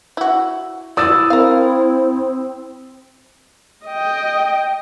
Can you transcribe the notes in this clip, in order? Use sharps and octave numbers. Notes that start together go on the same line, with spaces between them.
E4 F#4
E3 E4 F#4 D5 D#6 E6 A6
C4 A#4 F5
D#5 G5